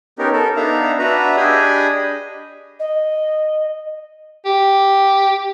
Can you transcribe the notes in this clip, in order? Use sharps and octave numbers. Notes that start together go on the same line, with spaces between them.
B3 C#4 D#4 G4 A#4
A4 A#4
B3 D4 D#4 E5 F5 A#5
D4 F#4 B4 E5 A#5
D4 G4 G#4 D#5 G#5 B5
D#5
G4